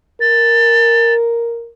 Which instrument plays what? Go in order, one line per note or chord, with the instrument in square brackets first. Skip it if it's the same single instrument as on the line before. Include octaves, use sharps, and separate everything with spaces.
[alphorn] A#4 [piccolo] A6